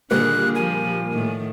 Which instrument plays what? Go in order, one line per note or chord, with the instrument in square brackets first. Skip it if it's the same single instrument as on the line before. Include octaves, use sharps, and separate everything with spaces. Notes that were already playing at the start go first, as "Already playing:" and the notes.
[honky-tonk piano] A#2 G3 A#3 [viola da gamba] D3 D#3 G#4 [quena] F#6
[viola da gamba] F3 [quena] G#5
[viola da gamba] A2 D#3